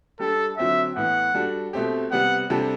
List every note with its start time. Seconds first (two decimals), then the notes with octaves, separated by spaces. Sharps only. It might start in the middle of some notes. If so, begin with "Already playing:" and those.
0.19 G3 D4 G4 A4
0.57 D3 F#3 C4 F#4 E5
0.96 A2 E3 B3 F#5
1.34 G3 D4 F#4 A4
1.73 B2 A3 C4 G4
2.11 C3 G3 B3 F#5
2.50 C3 G3 D4 A4